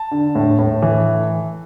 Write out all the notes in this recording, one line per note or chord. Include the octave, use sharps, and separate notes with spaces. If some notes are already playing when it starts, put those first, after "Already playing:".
Already playing: A5
D3
A2
A2
E3